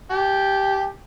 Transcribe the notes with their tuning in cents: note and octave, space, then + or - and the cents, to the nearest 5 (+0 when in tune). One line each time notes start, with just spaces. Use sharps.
G4 +0 A5 -45